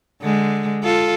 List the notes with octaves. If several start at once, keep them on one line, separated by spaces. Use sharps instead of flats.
D3 G#3
F4 A4